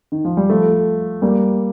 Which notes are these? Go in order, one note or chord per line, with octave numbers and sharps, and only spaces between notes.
D#3
F3
G3
F3 A3
G3 A#3